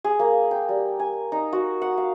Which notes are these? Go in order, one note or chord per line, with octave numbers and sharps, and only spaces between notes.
G#4
A#3
G5
G3
G#5
D#4
F#4
F#5
F5